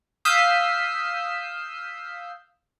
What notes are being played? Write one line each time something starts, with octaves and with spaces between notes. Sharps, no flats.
F5 D#6 E6 G6 B6 C7